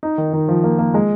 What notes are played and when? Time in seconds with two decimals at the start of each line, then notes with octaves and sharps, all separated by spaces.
0.03 D#4
0.18 D#3
0.33 D#3
0.49 F3
0.64 A#3
0.79 A#3
0.94 G#3